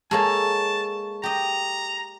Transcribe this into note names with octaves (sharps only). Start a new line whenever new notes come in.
G#3 A#3 A4 C#5 G#5 A5
G4 D#5 A#5